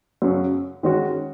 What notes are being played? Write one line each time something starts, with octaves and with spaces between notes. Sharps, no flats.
F#2 C#3 F#3
D#3 G#3 C#4 F#4